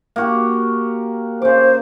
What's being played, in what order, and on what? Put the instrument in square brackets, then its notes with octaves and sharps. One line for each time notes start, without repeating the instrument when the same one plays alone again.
[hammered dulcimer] A#3 F#4 G4
[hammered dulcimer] C#3 D6 [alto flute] C5